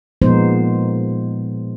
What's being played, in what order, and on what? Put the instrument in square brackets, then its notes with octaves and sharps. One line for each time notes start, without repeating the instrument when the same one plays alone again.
[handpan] A#2 F3 G#3 B3 D#4 C5